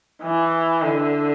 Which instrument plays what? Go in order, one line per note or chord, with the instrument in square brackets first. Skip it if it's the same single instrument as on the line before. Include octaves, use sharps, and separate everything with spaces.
[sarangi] E3
D3